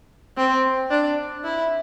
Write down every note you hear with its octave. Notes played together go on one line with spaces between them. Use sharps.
C4
D4
E4